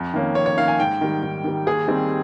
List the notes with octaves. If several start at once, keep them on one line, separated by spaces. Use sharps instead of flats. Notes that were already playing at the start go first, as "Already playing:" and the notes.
Already playing: F2
D#3 A#3 C#4
F2 C#5
C#5
D#3 A#3 C#4 F5
G#5
G#2 G5
D#3 G3
G#2
D#3 G3
D#2 G#4
D#3 G3 C4 D#4